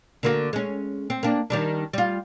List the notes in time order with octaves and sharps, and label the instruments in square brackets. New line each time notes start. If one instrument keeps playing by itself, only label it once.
[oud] D3 A#3 F#4
G#3 C#4
C4
A#3 D4
D#3 G3 D4
G3 F4